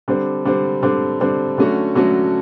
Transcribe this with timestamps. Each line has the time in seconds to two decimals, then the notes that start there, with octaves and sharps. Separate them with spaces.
0.08 D3 G3 C4
0.45 D3 G3 C4
0.83 D3 G3 C4
1.20 D3 G3 C4
1.58 D3 F#3 A3 C#4 F#4
1.95 D3 F#3 A3 C#4 F#4